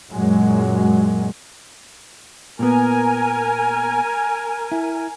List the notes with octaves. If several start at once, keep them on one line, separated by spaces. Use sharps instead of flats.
F#2 A#2 F#3 G#3
A#2 B3 A#4 G#5
E4